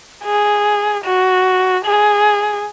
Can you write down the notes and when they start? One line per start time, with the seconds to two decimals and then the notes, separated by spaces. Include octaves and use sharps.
0.24 G#4
1.05 F#4
1.85 G#4